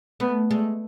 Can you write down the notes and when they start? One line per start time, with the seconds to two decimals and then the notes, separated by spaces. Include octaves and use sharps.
0.20 A3 B3
0.50 G#3 A3